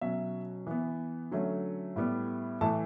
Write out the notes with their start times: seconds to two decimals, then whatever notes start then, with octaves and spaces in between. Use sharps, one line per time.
0.01 B2 F#3 C#4 E5
0.67 E3 B3
1.31 D3 F#3 A3 C#4
1.96 A2 G3 B3
2.61 A2 E3 A3 A5